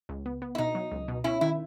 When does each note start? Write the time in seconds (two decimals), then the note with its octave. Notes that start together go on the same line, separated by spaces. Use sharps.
0.09 C#2
0.26 B3
0.42 B3
0.55 E4
0.58 B2 D#4
0.75 F#3
0.92 C#2
1.08 B2
1.24 C#4 E4
1.41 D#3 E4